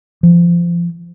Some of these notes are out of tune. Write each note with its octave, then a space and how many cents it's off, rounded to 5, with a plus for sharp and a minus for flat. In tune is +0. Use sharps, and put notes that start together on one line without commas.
F3 -25